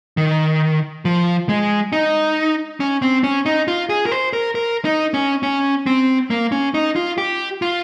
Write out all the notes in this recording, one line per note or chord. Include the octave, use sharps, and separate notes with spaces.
D#3
F3
G#3
D#4
C#4
C4
C#4
D#4
F4
G#4
A#4
C5
A#4
A#4
D#4
C#4
C#4
C4
A#3
C#4
D#4
F4
G4
F4